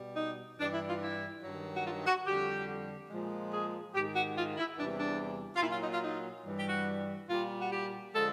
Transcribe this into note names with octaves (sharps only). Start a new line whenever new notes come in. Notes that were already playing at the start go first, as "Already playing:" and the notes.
Already playing: B2 G3
D#4
G2 E3 G3 D4
E4
F4
E4
G2 D#3 F#3
F#4
F4
F#4
F2 D3 G3 G4
A#2 F3 G#3
G#4
G#2 D#3 G#3 G4
F#4
F4
E4
E2 C3 E3 G3 D4
D4
F4
A#2 E4
F#3 F4
D#4
F4
D#4
G2 E3 G3
G4
F#4
A#2 G3 F4
F#4
G4
D3 F3 G#3 A4